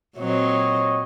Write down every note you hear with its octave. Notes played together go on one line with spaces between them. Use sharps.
A#2 F#3 C4 C#5 D#5